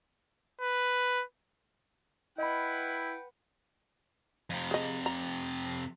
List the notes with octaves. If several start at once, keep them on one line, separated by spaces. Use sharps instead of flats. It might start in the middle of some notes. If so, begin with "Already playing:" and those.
B4
E4 B4 D#5 F#5 G5 B5
F2 C3
G#4 D#5
A#5